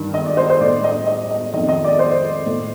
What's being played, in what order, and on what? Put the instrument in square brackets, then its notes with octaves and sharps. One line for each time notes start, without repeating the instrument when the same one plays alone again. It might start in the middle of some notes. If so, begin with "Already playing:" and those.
Already playing: [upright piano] G2 D#3
D#5
D5
C5
C5
A2 D5
D#5
D#5
D#5
D#3 D#5
F2
D#5
D5
C5
A2